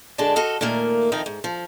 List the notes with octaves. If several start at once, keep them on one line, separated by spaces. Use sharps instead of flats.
F#2 D3 G#3 D4 D5 A5
F#4 A4 D#5 F5
A#2 D#3 A3 A#3
D#3 F3 C4 D#4
G#2
F3